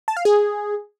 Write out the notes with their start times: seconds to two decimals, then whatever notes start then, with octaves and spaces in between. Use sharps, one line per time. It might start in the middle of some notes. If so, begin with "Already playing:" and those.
0.08 A5
0.17 F5
0.25 G#4